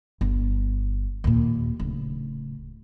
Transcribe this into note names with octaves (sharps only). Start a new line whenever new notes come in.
G1
D#2 A#2
D1 C#3